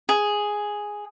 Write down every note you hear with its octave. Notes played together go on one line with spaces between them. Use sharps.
G#4